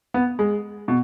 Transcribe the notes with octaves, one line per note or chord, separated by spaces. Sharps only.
B3
G#3
B2